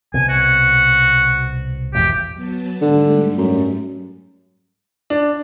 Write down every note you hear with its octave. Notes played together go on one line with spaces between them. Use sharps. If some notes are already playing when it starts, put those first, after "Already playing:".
C2 B2 G#5
F#4
G#1 E2 G4
F#3 B3 A5
G#2 D3 G3 A3
F#2
D4